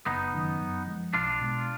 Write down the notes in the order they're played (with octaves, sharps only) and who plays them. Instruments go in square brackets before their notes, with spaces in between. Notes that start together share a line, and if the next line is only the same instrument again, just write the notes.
[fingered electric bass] F#1 [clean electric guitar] B3 D#4
[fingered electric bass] F#2 D#3
F#2
F3 G#3
[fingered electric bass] B1 [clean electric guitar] D4 F4
[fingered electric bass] B2 G#3